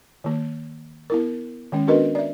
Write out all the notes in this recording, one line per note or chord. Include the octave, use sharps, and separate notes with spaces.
D#3 A#3
B3 E4 A#4
D#3 G#3 C#4
B3 D4 F#4 A#4 B4 D#5
D5 E5